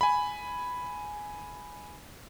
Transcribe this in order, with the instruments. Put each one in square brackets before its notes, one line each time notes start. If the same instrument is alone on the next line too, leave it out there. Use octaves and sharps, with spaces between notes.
[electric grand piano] G#5 B5